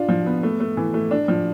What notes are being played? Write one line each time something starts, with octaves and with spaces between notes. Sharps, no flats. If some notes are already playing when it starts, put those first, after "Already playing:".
Already playing: D4 F4
F3
B3
A3
A3
E3
A3
D4
F3